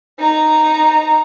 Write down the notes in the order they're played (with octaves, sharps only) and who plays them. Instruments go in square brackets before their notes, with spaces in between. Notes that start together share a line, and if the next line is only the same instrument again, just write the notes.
[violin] D#4 A#5